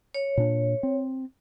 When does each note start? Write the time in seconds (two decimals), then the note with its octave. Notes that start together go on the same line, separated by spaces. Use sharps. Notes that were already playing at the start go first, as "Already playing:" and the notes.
0.14 C#5
0.37 A#2 D4
0.83 C4